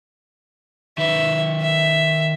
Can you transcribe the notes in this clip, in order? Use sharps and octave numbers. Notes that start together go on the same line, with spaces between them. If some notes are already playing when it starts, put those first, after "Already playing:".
D#3 B4 E5
E5